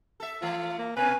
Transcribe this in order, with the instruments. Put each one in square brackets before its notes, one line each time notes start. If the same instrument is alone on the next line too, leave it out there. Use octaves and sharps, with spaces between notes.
[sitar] A4 E5
[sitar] E3 A3 [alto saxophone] F4
[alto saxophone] A#3
[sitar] B2 C#4 [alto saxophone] B4 [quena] G#5